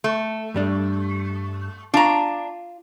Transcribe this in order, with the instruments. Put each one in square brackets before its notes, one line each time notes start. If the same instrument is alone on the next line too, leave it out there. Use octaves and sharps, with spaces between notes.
[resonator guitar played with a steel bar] A3
[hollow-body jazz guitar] G2 G3 D4
[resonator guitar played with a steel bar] D4 A#5 [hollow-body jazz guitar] F4